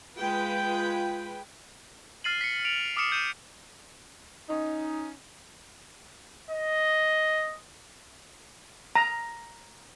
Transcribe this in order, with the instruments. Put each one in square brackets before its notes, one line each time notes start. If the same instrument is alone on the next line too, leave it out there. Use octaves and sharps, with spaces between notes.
[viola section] G#3 B4 G5 [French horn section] F4
[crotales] F6 A6 C7 D#7 F#7
B6 C#7
D7 F7
D6 D#6 F6 C7 C#7 E7
G6 D#7 E7
[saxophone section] C#4 D#4
[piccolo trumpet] D#5
[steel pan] A#5